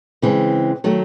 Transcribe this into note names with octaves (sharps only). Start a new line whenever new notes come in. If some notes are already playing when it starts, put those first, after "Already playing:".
C#3 E3 G#3 C4
D#3 F#3 A3